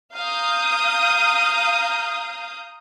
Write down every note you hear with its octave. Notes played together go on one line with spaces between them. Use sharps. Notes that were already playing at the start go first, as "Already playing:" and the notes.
F5 A#5 D#6 G6